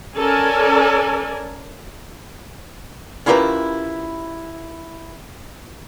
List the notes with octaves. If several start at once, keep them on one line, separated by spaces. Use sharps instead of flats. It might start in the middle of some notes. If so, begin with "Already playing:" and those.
C#4 A4 A#4 D5 G#5
C#4 E4 F4 G4 A#4 B4